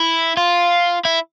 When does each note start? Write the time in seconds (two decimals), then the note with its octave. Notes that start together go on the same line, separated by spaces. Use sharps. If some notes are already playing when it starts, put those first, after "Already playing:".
Already playing: E4
0.37 F4
1.05 E4